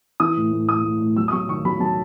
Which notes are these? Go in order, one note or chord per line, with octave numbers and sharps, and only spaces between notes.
E3 D#6
A2
A2
A2 D#6
A2
A2
F#3 E6
D#6
F#3 C#6
D#3 C#6
F#3 B5
F#3 A5